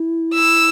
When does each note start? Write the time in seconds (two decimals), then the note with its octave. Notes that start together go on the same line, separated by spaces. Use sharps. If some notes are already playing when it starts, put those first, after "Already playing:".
Already playing: E4
0.35 E6